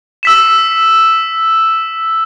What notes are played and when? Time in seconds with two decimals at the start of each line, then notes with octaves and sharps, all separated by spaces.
0.23 E6 B6 E7